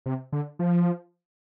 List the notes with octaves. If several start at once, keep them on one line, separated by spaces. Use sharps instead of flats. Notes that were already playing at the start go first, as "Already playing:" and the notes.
C3
D3
F3